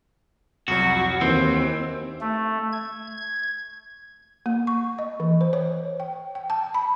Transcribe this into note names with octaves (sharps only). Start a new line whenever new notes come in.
C2 F2 F#3 F#4
D#2 E3 C4
A3
G#6
G#6
A#3
C#6
D#5
E3
C5
C#5
G5
G5
A5
B5